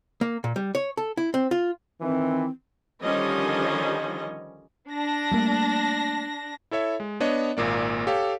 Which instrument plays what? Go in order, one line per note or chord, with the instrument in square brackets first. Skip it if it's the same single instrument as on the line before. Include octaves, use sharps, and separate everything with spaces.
[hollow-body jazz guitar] A#3
A#2
G3
C#5
A4
E4
C4
F4
[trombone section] D#3 E3 [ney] C4
[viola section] D3 D#3 F3 G3 C#4 D#5
[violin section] D4 A#6
[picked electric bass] G3 A3 A#3
[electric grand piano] E4 A4 C#5 E5
G#3
B3 D4 C#5 D#5
G#1 A#2 A#3 D5
G4 A4 C#5 F5